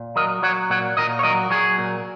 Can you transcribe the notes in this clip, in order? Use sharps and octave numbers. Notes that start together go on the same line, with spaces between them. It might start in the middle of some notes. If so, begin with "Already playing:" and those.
Already playing: A#2
F#3 A#4 D#5
F#3 C#5 F#5
A#2 C#5 F#5
A#2 A#4 D#5
C#5
F#3 A#4 D#5
F#3 G#4 C#5
A#2